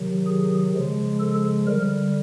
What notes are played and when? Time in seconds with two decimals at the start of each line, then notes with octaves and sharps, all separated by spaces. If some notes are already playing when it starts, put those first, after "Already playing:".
Already playing: C3 D#3 F#3
0.27 G#4
0.74 C#3 F3 G#3
1.20 A4
1.67 D3 G3 A#4